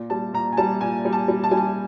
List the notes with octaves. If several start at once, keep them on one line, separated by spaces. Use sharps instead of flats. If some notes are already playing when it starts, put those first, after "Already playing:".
Already playing: A#2
G3 A5
A#2 A#5
G#5
G3 A5
A#2 G#5
G3
A5
G3
A5
G3 G#5
A5